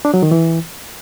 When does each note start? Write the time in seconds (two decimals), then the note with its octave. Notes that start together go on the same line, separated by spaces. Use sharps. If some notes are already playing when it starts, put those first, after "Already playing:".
0.05 D4
0.14 F#3
0.23 D#3
0.31 E3